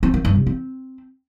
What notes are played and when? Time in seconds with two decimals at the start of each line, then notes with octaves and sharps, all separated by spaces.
0.03 C4
0.14 D#3
0.25 G2
0.36 C3
0.46 C4